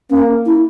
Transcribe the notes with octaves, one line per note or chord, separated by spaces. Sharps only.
A#3 C#4
E4